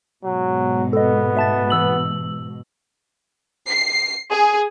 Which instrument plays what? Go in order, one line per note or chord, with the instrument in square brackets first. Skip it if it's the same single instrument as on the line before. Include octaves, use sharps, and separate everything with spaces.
[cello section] G#2 B2 [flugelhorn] F#3
[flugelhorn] B3 [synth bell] A4 D#5
[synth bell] E5 A5 A6
E3 E6 F#7
[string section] C7
G#4